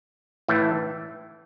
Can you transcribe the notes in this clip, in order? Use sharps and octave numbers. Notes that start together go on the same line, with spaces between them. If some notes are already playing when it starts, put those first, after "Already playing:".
A2 E3 A3